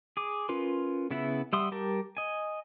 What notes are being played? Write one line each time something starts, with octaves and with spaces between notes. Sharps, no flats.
G#4 D6
C#4 F4 A#4 B4 C6
C#3 B3 E4 E5 F#5
G3 E5 F#5 C6 D#6
G3 G4 A#4 A5
D#5 G#5